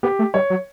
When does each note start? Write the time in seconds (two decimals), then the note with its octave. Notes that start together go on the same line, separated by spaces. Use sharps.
0.03 B3 G4
0.19 A3
0.34 G3 C#5
0.50 F#3